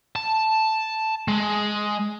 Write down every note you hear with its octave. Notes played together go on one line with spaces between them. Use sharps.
A5
G#3